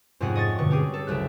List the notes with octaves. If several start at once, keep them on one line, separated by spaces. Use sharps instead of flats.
F2 G#2 C3 C#4 G#4 F#5
D#5 C#6 A6
G2 B2 D3 C#6
C#4 G4 G#4
A4
F#1 C2 E5 F#6